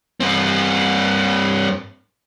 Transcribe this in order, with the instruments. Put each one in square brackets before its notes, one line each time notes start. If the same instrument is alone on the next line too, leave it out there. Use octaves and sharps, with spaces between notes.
[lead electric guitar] G2 C4